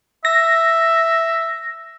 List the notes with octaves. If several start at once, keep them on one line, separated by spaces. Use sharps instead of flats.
E5 A#6